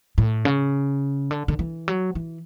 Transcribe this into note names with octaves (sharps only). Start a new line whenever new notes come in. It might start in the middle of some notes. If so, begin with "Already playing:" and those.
A2
C#3
D3
D3
E3
F#3
E3